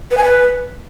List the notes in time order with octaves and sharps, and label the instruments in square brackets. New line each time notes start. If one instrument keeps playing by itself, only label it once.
[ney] B4
G#5
B4